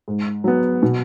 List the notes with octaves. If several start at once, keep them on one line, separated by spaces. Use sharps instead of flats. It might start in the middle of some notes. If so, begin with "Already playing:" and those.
G#2
F#3 B3
B2